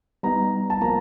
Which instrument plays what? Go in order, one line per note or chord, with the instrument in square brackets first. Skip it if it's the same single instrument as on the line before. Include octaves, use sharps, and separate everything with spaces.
[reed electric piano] G3 B3 D#4 [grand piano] A#5
[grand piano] A5
[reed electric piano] F3 A#3 [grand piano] A#5